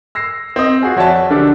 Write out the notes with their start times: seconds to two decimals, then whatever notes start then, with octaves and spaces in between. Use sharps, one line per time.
0.15 E6 A#6 C7
0.56 C4 D#5
0.83 F4 F#4 G#4
0.96 F2 F#4 C#5 D5 E5 A5
1.30 B1 D3 D4 G4 A4